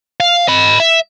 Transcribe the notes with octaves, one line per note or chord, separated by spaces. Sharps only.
F5
D#5 B5
E5